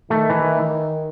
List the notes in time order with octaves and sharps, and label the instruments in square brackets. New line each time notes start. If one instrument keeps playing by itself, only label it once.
[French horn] D#3 [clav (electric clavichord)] A3
[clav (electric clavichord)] E3